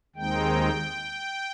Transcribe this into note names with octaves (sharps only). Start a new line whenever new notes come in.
D#2 D#3 G#3 C4 D#4 G5